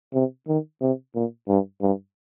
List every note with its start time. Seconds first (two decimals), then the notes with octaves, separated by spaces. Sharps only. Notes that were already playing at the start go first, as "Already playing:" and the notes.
0.14 C3
0.48 D#3
0.81 C3
1.15 A#2
1.48 G2
1.82 G2